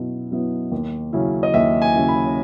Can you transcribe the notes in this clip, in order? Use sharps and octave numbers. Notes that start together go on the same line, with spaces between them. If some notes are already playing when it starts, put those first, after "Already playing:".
Already playing: B2 F#3 B3 E4
F#3 B3 E4
D#2
C#3 F#3 C#4 E4
D#5
D#2 E5
G#5
C#3 F#3 C#4 E4
B5